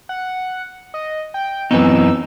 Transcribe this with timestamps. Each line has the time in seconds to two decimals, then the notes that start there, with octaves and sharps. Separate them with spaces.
0.09 F#5
0.94 D#5
1.34 G5
1.71 F#2 E3 B3 C4 D#4 B4 E6